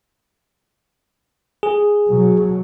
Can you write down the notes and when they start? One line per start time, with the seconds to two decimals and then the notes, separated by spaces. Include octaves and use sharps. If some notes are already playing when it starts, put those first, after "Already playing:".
1.63 G#4
2.09 B2 F#3